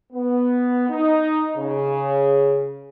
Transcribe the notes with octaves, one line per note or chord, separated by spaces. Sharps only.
B3
D#4
C#3